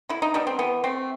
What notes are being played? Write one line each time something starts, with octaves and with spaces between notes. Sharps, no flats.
D3 E4
D#4
G3 B3 D4
C4
E3 B3
A3 C4